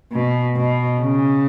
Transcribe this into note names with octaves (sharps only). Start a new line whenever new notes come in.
B2
B2
C#3